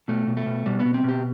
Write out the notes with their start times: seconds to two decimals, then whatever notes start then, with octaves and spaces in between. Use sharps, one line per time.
0.08 B2 A3
0.27 B2
0.37 A3
0.46 B2
0.66 B2 G3
0.80 B3
0.85 B2
0.94 C4
1.03 B2
1.09 G4